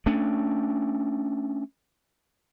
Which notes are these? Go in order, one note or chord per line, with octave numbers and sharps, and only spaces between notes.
A3 C#4 D4